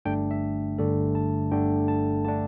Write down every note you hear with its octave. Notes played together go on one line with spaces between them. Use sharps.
G1 G2 D3 A3 D4 G5
E5
G1 G2 D3 A3 D4 A4
A5
G1 G2 D3 A3 D4 G5
A5
D3 A3 D4 A5